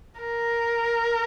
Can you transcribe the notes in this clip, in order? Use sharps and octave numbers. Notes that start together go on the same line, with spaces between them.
A#4